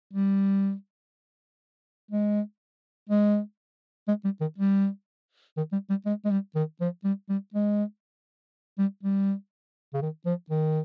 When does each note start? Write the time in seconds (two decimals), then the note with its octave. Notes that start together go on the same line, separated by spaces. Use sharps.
0.13 G3
2.11 G#3
3.09 G#3
4.08 G#3
4.24 G3
4.40 D#3
4.58 G3
5.57 D#3
5.72 G3
5.90 G3
6.05 G#3
6.25 G#3
6.31 G3
6.55 D#3
6.80 F3
7.04 G3
7.29 G3
7.54 G#3
8.78 G3
9.03 G3
9.93 C#3
10.02 D#3
10.26 F3
10.50 D#3